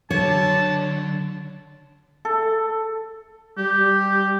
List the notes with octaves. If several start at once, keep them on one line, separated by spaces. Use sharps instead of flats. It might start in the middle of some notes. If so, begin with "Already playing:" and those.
D3 F#3 C#5 A5
A4
G3 G4